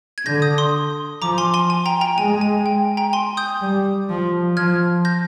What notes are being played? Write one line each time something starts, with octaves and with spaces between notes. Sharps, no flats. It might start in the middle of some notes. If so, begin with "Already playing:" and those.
G#6
D3 G6 A#6
D#6 G6
C6 D#6
F3 A#5 D6
G#5 C6
G#5 C6
G#5
G5 A#5
G5 A#5
G#3 G#5
G#5
G5
G5 A#5
G#5 C6
D#6 G6
G3
F3
F3 F6 G#6
G6 A#6